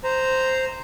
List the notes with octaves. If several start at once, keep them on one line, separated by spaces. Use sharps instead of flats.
C5 A#5